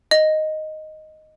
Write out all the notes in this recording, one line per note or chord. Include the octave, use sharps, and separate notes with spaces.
D#5